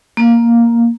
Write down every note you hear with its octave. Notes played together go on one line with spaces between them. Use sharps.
A#3